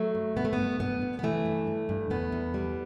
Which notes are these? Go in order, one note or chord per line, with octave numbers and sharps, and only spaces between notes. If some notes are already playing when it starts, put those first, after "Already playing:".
Already playing: F#3 A3
G2
G2 B3
A3
B3
G2
G2 B3
G2
B3
E3 A3
G2
G2
G2
E2 B3
E2
G3